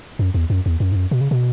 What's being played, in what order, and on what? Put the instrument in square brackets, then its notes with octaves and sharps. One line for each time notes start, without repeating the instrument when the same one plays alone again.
[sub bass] F#2
E2
F#2
E2
F#2
G#2
F#2
B2
C#3
B2